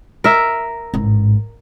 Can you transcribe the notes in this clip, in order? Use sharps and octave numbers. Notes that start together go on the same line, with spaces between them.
A#4 E5
A1 G#2